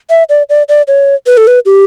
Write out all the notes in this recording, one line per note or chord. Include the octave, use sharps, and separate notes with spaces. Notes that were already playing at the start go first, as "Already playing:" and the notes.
E5
D5
D5
D5
C#5
B4
A4
B4
G4